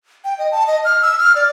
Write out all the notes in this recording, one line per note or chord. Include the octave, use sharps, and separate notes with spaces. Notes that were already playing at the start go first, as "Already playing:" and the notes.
G5
D#5
A5
D#5
F6
E6
F6
D5